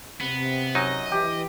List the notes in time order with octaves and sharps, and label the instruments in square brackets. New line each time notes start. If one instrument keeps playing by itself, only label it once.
[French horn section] C3 [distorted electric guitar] B3
[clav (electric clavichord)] F#2 F#3 D#4 [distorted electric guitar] D#5
[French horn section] E3 [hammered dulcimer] G4